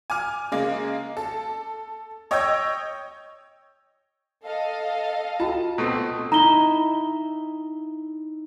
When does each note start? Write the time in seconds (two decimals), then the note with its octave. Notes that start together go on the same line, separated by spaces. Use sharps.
0.10 G#5 D6 F6
0.52 C#3 G#3 A#3
1.17 A4
2.31 C#5 D#5 G5 E6 G6 G#6
4.45 A4 D#5 F5
5.40 F4 F#4 G5 A5
5.78 B2 A3 C4
6.32 D#4 E4 A#5 G7